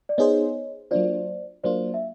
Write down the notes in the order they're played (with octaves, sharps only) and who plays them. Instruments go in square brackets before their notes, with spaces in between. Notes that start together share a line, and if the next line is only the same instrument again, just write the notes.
[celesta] D5
[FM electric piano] B3 D#4 G#4 C5 [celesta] C#5 D#5
[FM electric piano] F#3 A#3 D4 F4 [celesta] C5 D5
[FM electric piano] F#3 A#3 D4 F4 [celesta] C5 D5
[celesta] E5